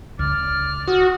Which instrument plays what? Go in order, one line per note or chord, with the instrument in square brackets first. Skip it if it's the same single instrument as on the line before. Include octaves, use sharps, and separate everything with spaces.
[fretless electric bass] C#2 [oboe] D5 [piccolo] F6
[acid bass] F#4 [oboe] D#6